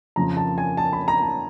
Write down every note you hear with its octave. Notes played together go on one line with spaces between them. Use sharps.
F2 C#3 F3 A#5
A5
G#5
A5
B5
A#5
A5